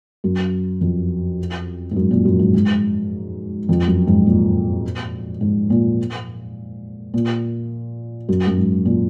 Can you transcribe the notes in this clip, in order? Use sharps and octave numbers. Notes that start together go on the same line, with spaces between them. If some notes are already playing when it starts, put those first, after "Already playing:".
F#2
F2
G#2
F#2
A#2
F#2
G#2
G#2
F2
F#2
G#2
A#2
G#2
A#2
A#2
F#2
F#2
G#2
A#2